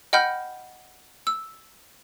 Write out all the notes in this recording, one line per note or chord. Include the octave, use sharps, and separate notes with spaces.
D#5 F#5 G5 B5 F6 G6
E6